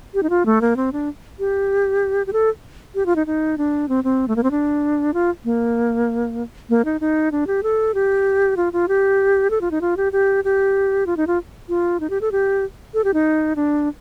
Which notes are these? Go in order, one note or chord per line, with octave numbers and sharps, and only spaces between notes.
G4
D#4
F4
A3
A#3
C4
D4
G4
G4
A4
G4
F4
D#4
D#4
D4
C4
C4
A3
A#3
C4
D4
F4
A#3
A#3
D#4
D#4
D4
G4
A4
G4
F4
F4
G4
A4
F4
D#4
F4
G4
G4
G4
F4
D#4
F4
F4
D#4
G4
A4
G4
A4
G4
D#4
D4